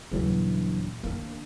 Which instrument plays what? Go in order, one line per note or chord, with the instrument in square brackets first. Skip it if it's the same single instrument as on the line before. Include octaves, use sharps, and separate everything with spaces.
[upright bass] D#1 D4 [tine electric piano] C#3 E3 F#3
[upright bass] D#3 D4 [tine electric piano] A#3